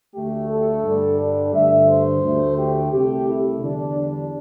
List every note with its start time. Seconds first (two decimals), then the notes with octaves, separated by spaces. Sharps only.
0.13 D2 D3 A3 G4
0.49 A4
0.83 G2 D3 G3
1.18 D4
1.52 G2 D3 A3 E5
1.87 C5
2.22 D2 D3 A3
2.57 G4
2.91 C2 C3 A3 G4
3.26 E4
3.61 E2 D3 G3 D4
3.97 D4